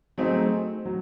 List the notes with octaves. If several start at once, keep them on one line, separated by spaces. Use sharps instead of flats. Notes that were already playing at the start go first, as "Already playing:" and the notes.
F#3 A3 C4 D#4 G#4
F#3